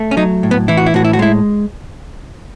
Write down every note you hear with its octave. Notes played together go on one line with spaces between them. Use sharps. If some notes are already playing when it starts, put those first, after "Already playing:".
Already playing: A3
C#4
F#3 D#4
A2
B3
E3 E4
F#4
E4
A2 F#4
E4
F#4
G#3 E4